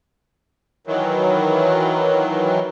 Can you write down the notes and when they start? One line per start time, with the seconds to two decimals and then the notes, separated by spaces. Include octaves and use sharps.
0.87 D#3 E3 F#3